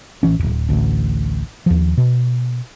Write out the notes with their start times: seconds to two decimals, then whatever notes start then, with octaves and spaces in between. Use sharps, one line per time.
0.23 A1 E3 C#4
0.39 D1 D#2
0.69 A1 D2
1.66 D#2 F3
1.97 B2